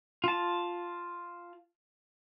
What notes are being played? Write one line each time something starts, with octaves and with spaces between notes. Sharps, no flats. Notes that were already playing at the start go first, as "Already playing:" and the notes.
F4 A5